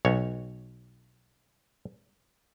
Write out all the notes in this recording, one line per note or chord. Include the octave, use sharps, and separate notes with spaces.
B1 C#5